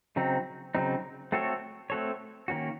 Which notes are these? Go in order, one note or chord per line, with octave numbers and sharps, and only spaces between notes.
C#3 F#3 C4 D#4
C#3 F#3 C4 D#4
A3 C4 F#4 A4 C#5
A3 C4 F#4 A4 C#5
D#3 A#3 C#4 F#4